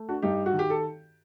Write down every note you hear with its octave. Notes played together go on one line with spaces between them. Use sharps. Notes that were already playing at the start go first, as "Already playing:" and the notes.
Already playing: A3
D4 F#4
G2 D#4 G4
F#4
D#3
G4
A4